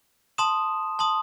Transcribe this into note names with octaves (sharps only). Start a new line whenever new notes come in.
A5 C6 D#6 E7
A5 C6 D#6